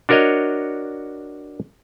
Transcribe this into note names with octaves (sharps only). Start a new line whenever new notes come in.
D4 F#4 A#4 C#5 D#5